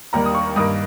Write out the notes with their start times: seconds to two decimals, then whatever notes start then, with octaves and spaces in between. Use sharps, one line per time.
0.13 D#2 D#3 G3 A#3 A#5
0.25 D#6
0.35 C#6
0.56 G2 D#3 A#3 D#6